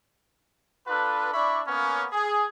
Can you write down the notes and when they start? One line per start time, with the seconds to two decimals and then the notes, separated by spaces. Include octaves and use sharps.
0.88 D4 F4 A4 B4
1.33 D4 E4 D5 E5 B5 C#6
1.67 A#3 B3 C#4
2.13 G#4